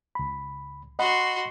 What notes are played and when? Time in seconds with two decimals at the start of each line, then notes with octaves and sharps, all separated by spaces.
0.15 C#2 B5
0.99 F#4 D#5 F#5 B5 C6